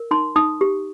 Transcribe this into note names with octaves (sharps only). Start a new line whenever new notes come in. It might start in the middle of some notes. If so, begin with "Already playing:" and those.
Already playing: A#4
D#4 C6
D#4 D#6
G4